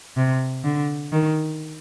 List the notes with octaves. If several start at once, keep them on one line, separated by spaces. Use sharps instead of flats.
C3
D3
D#3